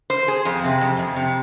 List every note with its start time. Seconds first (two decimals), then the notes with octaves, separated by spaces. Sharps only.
0.10 C5
0.28 G#4
0.45 F2
0.64 C3
0.81 F2
0.99 F2
1.16 C3